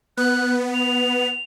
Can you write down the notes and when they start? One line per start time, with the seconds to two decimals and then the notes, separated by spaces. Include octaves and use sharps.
0.17 B3 F#6
0.74 F7